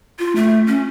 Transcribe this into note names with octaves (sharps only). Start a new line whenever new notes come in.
F4
A3
C#4